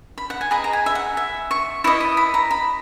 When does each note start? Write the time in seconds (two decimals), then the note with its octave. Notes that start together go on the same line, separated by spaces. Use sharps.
0.18 B5
0.30 F#5
0.41 G#5
0.51 G#4 B4 D#5 A#5
0.64 A#5
0.73 G#5
0.86 E5
0.95 F#5
1.17 E5
1.51 C#6
1.84 E4 B4 D#5 C#6
2.00 D#6
2.17 B5
2.34 A#5
2.51 B5